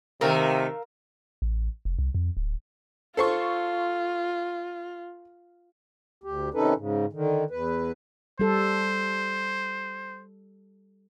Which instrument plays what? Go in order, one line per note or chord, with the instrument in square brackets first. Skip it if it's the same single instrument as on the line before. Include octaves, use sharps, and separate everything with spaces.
[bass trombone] C3 [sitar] D#3 A3 [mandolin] A#4 F5 E6
[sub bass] A1
F1
C2
F2
D1
[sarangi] F4 [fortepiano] A4 C5 C#6
[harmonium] D2 G4
C3 D#3 C#4 D#4 A4 B4
G#2 C#3
D3 D#3
E2 B4
[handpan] G3 A4 [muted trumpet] C5